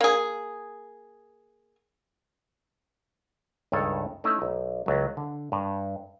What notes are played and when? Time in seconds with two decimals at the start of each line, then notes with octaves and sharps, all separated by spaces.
0.01 A#3 G#4
3.72 C#2 G2 D#3 A4 C#5
4.24 A3 C#4 D#4 E4
4.42 B1
4.86 C#2 F#3
5.17 D3
5.52 G2